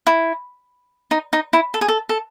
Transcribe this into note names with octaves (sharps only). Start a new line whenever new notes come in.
E4
D#4
D#4
E4
A4
G#4
A4
A4